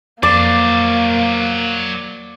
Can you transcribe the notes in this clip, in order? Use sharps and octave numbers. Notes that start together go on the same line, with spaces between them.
F2 F#3 A#3 C5 D5 D6